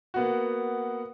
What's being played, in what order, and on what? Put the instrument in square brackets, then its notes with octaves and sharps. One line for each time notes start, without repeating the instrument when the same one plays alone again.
[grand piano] A#3 B3 F#4